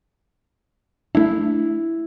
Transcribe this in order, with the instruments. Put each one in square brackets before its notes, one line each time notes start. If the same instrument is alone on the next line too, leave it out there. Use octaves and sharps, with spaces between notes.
[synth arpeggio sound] A3 D4 [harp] E4